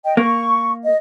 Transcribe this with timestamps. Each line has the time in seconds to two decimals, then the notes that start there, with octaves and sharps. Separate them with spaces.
0.04 D#5 G5
0.17 A#3 C#6
0.84 D#5